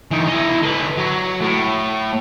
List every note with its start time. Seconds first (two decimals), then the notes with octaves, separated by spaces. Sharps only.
0.11 E3 D#4
0.28 E4 D#5
0.62 D3 B4
0.98 F#3
1.42 A2